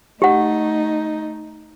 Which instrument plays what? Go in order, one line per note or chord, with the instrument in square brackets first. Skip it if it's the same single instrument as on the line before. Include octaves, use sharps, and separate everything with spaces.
[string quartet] A3 D#4 [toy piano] G4 F#5